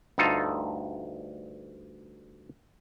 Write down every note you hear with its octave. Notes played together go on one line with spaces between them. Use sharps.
D2 G2 D#4 F4 A4